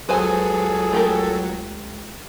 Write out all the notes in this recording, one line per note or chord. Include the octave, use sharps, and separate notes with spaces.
C#2 F#3 G#4 A4 B4 C5 G#5
A3 G4 A#4